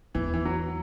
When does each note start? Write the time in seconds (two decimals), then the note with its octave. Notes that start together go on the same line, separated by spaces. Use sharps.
0.15 E2 E3
0.34 E3
0.45 F#3